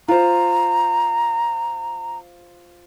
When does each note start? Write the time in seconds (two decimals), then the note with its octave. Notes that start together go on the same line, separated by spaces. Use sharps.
0.08 F4 C5 A#5